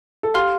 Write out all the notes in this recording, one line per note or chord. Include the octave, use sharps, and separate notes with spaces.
A4
G4 F5 C6 F6